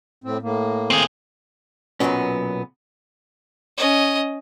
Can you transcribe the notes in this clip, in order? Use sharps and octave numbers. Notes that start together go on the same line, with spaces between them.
A2 C4
A2 A#3
C4 G#4
B1 A#2 F3 F#3 B3 C#4
C#4 D#5